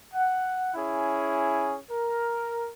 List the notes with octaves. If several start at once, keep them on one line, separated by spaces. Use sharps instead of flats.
F#5
C#4 E4 G#4
A#4